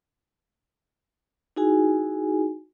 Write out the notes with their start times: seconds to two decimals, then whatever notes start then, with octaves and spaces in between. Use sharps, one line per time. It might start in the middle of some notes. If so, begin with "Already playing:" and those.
1.56 D#4 E4 F#4 G#4 G#5